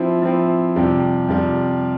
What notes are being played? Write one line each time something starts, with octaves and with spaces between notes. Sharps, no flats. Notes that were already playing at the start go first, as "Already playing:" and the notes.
Already playing: F3 C4 E4
F3 C4 E4
F2 C3 G3
F2 C3 G3